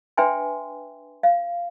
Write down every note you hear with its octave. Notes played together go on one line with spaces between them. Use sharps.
D4 B4 E5 G5 G#5 C6
F5